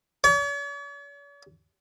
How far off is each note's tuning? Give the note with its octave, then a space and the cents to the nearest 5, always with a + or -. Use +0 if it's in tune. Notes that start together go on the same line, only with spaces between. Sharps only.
C#5 +45